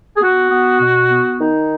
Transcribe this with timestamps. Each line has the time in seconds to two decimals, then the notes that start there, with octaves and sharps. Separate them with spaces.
0.17 G#4
0.22 B3 F#4
0.51 B3
0.80 B2
1.10 B3
1.40 D#3 D#4